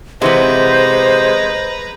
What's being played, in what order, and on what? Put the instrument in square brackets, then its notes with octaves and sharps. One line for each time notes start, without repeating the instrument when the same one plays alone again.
[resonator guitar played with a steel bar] C3 E3 B3 [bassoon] G#3 [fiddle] B4 A#5 [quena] C5